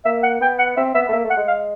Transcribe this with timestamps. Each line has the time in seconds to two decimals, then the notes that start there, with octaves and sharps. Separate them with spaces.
0.05 A#3 E5
0.23 F#5
0.41 B3 G5
0.59 F#5
0.77 C4 E5
0.94 B3 E5
1.08 A3
1.12 A#3 E5
1.25 A3
1.30 F#5
1.37 G#3
1.48 F5